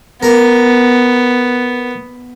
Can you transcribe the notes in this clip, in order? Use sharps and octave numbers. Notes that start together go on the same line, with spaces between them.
B3 A#4